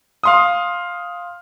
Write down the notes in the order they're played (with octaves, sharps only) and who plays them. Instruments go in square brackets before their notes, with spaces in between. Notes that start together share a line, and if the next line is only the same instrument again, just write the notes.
[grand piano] F5 C6 D#6